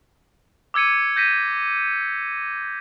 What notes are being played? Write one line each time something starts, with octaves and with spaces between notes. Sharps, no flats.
D6 E6 G#6 C#7 D#7
G6 A#6 B6 D#7